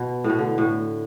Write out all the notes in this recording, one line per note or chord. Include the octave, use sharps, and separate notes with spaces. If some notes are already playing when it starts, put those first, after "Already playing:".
Already playing: B2
A2
B2
D3
A2